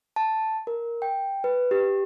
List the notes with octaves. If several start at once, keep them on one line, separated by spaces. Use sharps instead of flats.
A5
A#4
G5
B4
G4